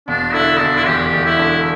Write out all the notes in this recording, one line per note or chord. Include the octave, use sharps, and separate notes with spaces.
E1 D4
D3 E4
E1 D4
E4
E2 G4
E1
E4
D3